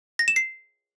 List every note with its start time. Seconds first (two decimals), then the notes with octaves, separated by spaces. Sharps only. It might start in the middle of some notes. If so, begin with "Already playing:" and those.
0.19 A#6
0.28 E7
0.36 C7